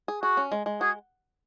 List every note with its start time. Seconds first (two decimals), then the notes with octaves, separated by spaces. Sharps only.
0.08 G#4
0.23 F#4 G#4
0.37 C#4
0.52 G#3
0.66 G#3
0.81 F#4 G#4